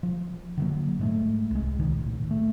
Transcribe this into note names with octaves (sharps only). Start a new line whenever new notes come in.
F3
D3 F#3 A#3
G#2 G#3 A3
C2 G#3
D#1 C2 A2 D#3
A3